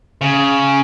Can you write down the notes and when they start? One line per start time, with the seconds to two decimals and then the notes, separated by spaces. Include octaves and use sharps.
0.21 C#3